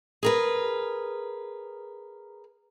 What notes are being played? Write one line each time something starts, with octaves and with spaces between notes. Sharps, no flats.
G#4 A#4 B4